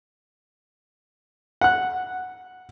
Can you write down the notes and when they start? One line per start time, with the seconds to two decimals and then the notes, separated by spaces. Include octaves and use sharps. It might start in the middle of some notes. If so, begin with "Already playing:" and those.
1.61 F#5 F#6